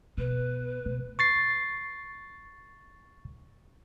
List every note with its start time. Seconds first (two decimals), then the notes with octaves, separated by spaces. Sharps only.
0.17 B2 B4
0.86 B2
1.19 C#6 A6 C7